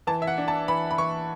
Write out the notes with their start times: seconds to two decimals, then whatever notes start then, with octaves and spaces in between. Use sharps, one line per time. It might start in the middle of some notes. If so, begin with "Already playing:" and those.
0.07 E3 A5
0.22 E5
0.27 F#5
0.38 D4
0.48 A5
0.68 E3 B5
0.91 B5
0.98 E3 C#6